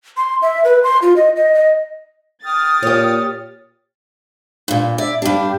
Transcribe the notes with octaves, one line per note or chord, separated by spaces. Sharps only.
C6
E5
B4
C6
F4
D#5
D#5
D#5
G5 D#6 F6 A6
A#2 G4 C#5
G2 A#2
D5 E5
G2 D4 G4